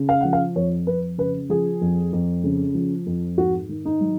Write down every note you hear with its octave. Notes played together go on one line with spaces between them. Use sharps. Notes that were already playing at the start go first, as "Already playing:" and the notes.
Already playing: C#3
F5
F3 F#5
F5
F2 C#5
F2 B4
C#3 B4
F3 G#4
F2
F2
C#3
F3
F2
G#2 F#4
D#3
D#4
F#3